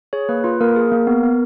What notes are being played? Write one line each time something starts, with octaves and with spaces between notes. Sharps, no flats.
G#4 C#5
A#3 B4
F4 B4
A#3 A#4
G#4
A#3
B3
B3